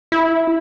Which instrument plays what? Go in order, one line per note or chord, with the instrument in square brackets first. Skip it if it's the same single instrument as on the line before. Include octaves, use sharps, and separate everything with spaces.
[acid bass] E4